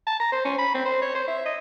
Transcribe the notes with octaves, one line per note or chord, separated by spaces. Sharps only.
A5
A#5
C5
C#4
B5
C4
C5
C#5
C5
E5
D#5